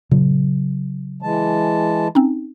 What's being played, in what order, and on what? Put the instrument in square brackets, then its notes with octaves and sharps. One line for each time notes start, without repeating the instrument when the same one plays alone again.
[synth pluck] A#2 [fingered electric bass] C#3 F#3
[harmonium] E3 G#3 A5
[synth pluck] C4 C#4 D#4